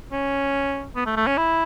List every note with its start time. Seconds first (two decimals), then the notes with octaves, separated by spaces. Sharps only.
0.12 C#4
0.96 B3
1.06 A3
1.16 A3
1.27 C#4
1.37 E4